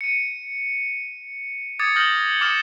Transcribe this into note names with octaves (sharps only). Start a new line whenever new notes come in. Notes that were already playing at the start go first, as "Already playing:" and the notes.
C#7 D#7
D6 D#6 G#6 A6 C#7
D#6 F6 G6 A#6 F#7 G7
D6 D#6 F6 A6 C#7 E7